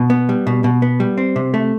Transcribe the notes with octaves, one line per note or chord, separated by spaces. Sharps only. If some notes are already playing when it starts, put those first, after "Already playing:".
Already playing: B2
B3
G3
B2
B2
B3
G3
C4
C3
A3